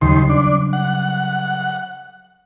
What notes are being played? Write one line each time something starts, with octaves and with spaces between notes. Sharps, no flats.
D#2 C#3 F#3 G3 C6
D4
F#5